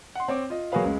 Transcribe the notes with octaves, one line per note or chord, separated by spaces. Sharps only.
F#5 C6
C4 C#5 D6
F4 D#5
F#3 A#3 F#4 G#4 B4 F5
C#2 G#3